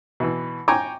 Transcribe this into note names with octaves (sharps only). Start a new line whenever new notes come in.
B2 E3
G5 G#5 A#5 C#6 D6